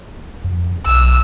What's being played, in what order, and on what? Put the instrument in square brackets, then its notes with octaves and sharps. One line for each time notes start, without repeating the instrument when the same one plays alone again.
[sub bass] F2
[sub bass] B1 [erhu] E6